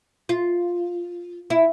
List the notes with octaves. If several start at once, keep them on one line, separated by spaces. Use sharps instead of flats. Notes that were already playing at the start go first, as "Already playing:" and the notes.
F4
E4